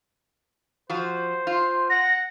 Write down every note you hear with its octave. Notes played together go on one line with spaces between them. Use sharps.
F3 F#4 C5
F4
F#5 A#6